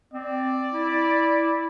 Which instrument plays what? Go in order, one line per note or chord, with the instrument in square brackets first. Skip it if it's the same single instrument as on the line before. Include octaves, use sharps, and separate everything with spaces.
[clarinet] C4 [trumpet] D5
[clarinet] E4